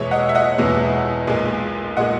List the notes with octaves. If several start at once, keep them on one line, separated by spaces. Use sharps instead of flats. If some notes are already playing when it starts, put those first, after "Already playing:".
Already playing: E2 B2 G#3 C#5 E5
D#5 F#5
E5
D#5 F#5
E2 B2 G#3
B1 A#2 G#3
A#2 G#3 D#5 F#5